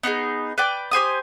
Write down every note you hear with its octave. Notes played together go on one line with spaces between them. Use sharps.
B3 D#4 F#4 G#4
B4 D5 G5 D6
G4 C5 G#5 D#6